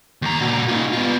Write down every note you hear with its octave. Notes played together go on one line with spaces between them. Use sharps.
D#2 A#5
A#2 F#4
D#4 F4
B3 F4